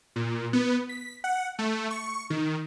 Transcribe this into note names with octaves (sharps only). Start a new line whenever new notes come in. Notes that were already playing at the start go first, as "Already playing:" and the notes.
A#2
B3
B6
F#5
A3
C#6
D#3